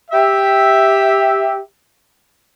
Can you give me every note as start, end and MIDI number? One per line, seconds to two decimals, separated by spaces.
0.11 1.58 67
0.11 1.58 76